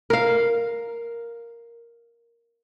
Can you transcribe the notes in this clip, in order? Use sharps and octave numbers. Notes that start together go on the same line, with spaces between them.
A#4 F5